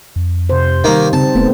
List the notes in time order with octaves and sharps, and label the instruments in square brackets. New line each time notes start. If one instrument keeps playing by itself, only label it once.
[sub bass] F2
[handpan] C3 C5
[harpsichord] D#3 A#3 [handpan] G3 D#4
[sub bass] C#3 [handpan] C4 [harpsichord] A5
[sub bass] E1 [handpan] A3 B3 C4